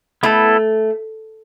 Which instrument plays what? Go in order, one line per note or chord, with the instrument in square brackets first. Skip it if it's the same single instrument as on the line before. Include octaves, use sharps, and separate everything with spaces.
[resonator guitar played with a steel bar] A3 [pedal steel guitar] B3 E4 A4